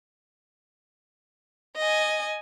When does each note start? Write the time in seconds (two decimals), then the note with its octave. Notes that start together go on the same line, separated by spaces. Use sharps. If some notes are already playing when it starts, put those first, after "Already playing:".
1.78 D#5 G#5